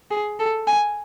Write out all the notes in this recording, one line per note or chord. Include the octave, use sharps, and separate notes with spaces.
G#4
A4
G#5